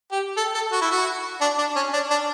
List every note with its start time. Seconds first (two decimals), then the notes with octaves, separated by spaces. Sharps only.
0.11 G4
0.37 A4
0.54 A4
0.72 F#4
0.81 E4
0.91 F#4
1.41 D4
1.58 D4
1.76 C#4
1.93 D4
2.10 D4